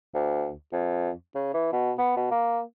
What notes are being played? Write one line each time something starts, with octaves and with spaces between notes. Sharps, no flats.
D2
F2
C#3
E3
B2
B3
B2
A#3